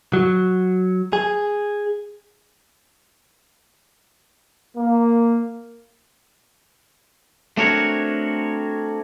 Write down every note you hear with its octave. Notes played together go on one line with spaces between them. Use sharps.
F#3
G#4
A#3
A3 C4 D4 F#4 A#4 C#5